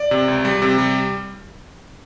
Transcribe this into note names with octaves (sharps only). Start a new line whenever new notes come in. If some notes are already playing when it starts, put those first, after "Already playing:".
Already playing: D5
C3
C#2
G3
C3
G3